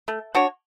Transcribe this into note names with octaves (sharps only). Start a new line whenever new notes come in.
A3
D4 F#4 C#5